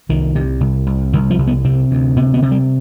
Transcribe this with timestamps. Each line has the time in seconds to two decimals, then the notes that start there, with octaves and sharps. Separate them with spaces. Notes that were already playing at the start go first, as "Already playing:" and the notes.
0.09 C2 D#3
0.35 C3
0.61 C2
0.86 C2
1.13 C2 D#3
1.30 F3
1.38 C2
1.47 B3
1.64 C3 C4
1.91 D2
2.17 C3 B3
2.34 B3
2.42 C3
2.51 G3